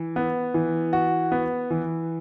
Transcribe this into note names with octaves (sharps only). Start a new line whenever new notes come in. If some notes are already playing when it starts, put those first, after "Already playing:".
Already playing: E3
B3
E3
F#4
B3
E3